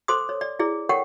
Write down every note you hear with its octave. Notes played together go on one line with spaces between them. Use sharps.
A4 C5 C6 D6 D#6
C#5
D5
E4 G#4 D5
A4 A#4 C#5 F#5 G5 C#6